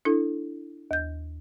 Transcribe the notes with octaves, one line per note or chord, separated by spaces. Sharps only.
D4 E4 A4
D#2 G6